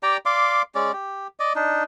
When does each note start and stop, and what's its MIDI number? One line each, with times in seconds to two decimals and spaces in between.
0.03 0.17 67
0.03 0.17 74
0.03 0.17 79
0.03 0.17 82
0.26 0.62 74
0.26 0.62 77
0.26 0.62 84
0.26 0.62 86
0.75 0.92 56
0.75 0.92 61
0.75 0.92 74
0.93 1.27 67
1.40 1.53 74
1.40 1.53 75
1.55 1.83 62
1.55 1.83 63